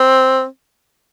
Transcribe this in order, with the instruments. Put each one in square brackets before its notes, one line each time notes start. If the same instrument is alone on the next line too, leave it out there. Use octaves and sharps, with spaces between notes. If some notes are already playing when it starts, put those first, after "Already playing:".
Already playing: [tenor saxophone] C4